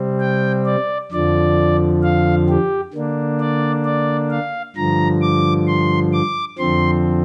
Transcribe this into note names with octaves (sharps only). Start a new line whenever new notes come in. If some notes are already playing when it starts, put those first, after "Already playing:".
Already playing: C3 G3 C4
G5
D5
F2 D3 F3 D5
F5
G4
D3 A#3 D4
D5
D5
F5
G2 D3 F3 A#5
D6
C6
D6
F2 D3 F3 C4 C6